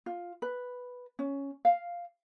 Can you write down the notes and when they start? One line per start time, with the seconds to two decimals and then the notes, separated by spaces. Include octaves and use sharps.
0.06 F4
0.42 B4
1.19 C#4
1.65 F5